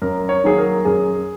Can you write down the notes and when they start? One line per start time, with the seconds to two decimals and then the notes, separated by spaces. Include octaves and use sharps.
0.02 F#2 A#4
0.29 C#5
0.44 D#3 F#3 A#3 G#4
0.58 A#4
0.85 F#2 G#4